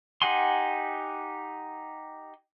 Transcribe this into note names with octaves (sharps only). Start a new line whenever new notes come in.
D#4 G4 F#5 G#5 C6